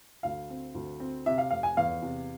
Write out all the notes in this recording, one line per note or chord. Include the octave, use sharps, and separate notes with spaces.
D2 F5
C4
D2
C4
C3 E5
F5
F1 F5
G#5
E2 F5
C3